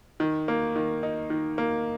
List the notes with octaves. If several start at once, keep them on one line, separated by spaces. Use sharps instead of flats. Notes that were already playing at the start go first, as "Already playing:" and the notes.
D#3
A#3
D#3
D#4
D#3
A#3